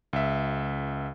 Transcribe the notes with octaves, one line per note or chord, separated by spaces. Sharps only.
C#2 E5